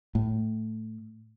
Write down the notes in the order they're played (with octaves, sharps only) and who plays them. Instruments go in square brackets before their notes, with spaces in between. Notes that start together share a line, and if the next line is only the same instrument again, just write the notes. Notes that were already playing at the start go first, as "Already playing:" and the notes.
[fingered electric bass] A2